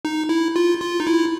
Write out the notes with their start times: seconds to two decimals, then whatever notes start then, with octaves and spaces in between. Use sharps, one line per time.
0.05 D#4
0.29 E4
0.56 F4
0.81 F4
1.00 D#4
1.07 E4